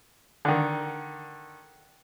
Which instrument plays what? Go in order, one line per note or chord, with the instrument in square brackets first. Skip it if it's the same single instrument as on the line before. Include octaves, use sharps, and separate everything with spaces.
[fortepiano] D3 D#3